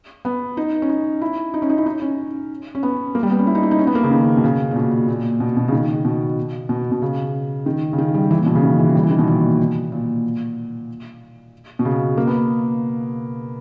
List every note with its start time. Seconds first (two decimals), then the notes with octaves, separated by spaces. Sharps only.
0.25 B3
0.57 D#4
0.82 C#4
0.89 D#4
1.21 E4
1.54 D#4
1.62 C#4
1.69 D#4
1.78 E4
1.86 D#4
2.02 C#4
2.75 C#4
2.83 B3
3.15 A#3
3.23 G3
3.30 B3
3.39 C#4
3.47 E4
3.55 D#4
3.63 E4
3.71 D#4
3.79 C#4
3.87 B3
3.95 A#3
4.04 C#3
4.11 D#3
4.37 B2
4.44 C#3
4.71 A#2
4.76 B2
5.08 A#2
5.40 B2
5.57 B2
5.68 C#3
5.72 D#3
6.05 B2
6.69 B2
6.92 B2
7.02 C#3
7.66 D#3
7.93 C#3
7.98 D#3
8.14 G3
8.31 E3
8.38 A#2
8.46 B2
8.55 C#3
8.63 D#3
8.79 E3
8.95 G3
9.03 E3
9.11 D#3
9.19 B2
9.27 A#2
9.92 A#2
11.79 B2
11.85 C#3
12.17 A#3
12.27 B3